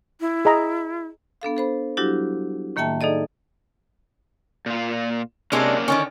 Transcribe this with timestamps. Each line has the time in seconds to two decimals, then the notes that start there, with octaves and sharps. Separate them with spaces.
0.20 E4
0.45 G#4 D#5 A#5
1.42 B3 D4 A4 F5
1.56 A4 C5 B5
1.97 F#3 G3 D4 E4 F#4 G4
2.76 A2 D#3 A#3 E5 G5 A5
3.01 D#4 G#4 A4 D5 D#5
4.66 A#2 F4
5.52 C3 G#3 A#3 C#4 D4
5.88 D3 D#3 C#4